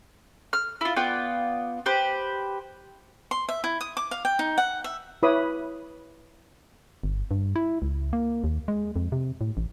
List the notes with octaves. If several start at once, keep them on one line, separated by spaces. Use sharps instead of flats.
F6
E4 F4
B3 F4 D5 G5
G4 B4 C5 C6
C6
E5
E4
D#6
D6
F5
G5
D#4
F#5
E5
E4 B4 C#5 B5 D6 D#6
G1
G2
E4
C#2
A#3
D#2
G#3
F2
C3
A2
A1